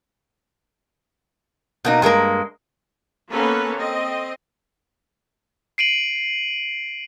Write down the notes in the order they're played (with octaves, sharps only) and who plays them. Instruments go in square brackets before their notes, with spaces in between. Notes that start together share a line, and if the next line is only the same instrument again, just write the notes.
[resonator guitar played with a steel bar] B2 A#3 D#4
G2 G#3 A#3 A#4
[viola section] A#3 B3 C#4 A4 B4
C4 D#5
[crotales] C7 D7 D#7 F#7